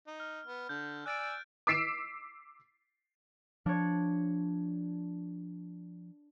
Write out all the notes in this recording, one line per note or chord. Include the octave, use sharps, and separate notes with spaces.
D#4
F6
B3
D3 G6
D5 G#5 E6 F#6 A6 D7
D6 E6 B6 C7 D7 E7
F3 D4 C#5